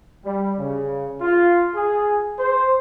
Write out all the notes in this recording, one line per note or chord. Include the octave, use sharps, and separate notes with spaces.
G3
C#3
F4
G#4
C5